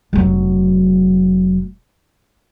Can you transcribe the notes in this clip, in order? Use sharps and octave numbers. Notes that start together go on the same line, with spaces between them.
F1 F#3